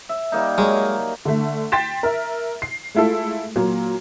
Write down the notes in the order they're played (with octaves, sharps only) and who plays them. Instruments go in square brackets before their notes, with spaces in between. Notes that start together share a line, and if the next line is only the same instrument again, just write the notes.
[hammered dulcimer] E5
G3 A#3 D#4
[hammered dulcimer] F#3 A#4 [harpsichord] G#3
[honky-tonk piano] D3 A3
G5 C6 A6 B6 E7
A#4 E5
C7
G#3 A3 E4 F4 A4
A#2 F#3 A#3